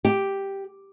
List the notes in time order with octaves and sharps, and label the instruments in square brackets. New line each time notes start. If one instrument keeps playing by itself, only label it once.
[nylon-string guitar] G4